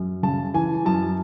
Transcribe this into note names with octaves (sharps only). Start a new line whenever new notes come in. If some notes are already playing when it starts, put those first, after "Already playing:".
Already playing: F#2
C#3 A5
E3 G#5
F#2 A5